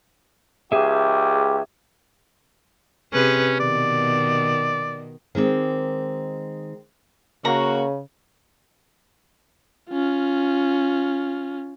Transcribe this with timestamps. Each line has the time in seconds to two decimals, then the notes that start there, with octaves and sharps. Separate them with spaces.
0.72 C#2 G4 G#4 E5
3.13 C3 C#4 G#4 B4
3.60 B2 D#3 D5
5.35 D#3 G#3 C4 D5
7.45 C#3 A#3 F#4 A#5
9.90 C#4 F4